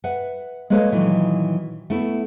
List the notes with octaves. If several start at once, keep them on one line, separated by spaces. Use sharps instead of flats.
B4 E5 F#5
G#3 A#3 A4 B4 C#5
A#2 D#3 E3 F#3
A3 B3 E4